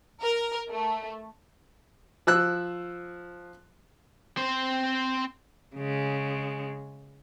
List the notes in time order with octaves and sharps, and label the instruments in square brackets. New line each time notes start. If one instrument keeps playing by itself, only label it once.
[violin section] A#4
A3
[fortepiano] F3 E6 F#6
[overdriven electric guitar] C4 C5
[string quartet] C#3 G#3